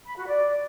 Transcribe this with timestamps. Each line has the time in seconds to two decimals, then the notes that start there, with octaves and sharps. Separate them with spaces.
0.06 B5
0.17 F#4
0.27 D5